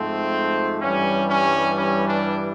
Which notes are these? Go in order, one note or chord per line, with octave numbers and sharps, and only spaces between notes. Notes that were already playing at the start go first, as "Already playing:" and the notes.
Already playing: G#2 F3 A3 C4
G2 E3 G3 C#4
C#4
C#4
D4